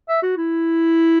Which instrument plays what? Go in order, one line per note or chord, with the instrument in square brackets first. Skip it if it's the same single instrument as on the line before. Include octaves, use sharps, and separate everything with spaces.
[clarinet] E5
F#4
E4